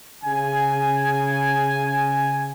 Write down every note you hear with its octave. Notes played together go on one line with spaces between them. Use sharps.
C#3 G#5